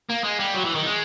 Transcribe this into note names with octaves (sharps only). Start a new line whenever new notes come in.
A#3
G#3
G3
F#3
E3
D#3
G#3